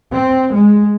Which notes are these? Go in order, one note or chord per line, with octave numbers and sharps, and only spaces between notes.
C4
G#3